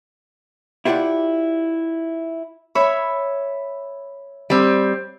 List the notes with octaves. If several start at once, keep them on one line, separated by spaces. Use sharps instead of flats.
E4 F4 G4 C5 D5 F#5
C#5 E5 B5
G3 C4